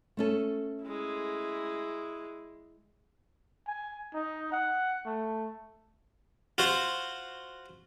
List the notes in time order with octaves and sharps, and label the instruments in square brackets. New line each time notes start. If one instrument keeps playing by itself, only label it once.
[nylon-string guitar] A3 C#4 A4
[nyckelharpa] G#3 E4
[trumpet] G#5
D#4
F#5
A3
[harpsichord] F4 F#4 C5